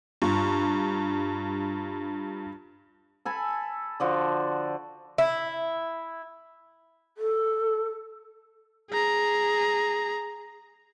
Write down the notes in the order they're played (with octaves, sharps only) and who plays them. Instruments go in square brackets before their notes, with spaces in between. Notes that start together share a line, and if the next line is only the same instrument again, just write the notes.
[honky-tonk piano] G2 [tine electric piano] F4 A#5 C#6
[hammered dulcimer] A4 G#5 B5
D3 F3 F#4
[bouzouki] E4
[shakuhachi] A4
[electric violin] G#4 A#5